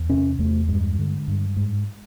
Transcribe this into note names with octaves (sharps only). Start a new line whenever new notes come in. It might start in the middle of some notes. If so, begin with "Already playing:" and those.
Already playing: E2
C3 C#4
E2 A3
G2 G#3
D3
G2
G#2